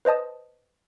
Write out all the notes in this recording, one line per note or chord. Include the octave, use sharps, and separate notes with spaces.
B4 C5 D#5 A5 D#6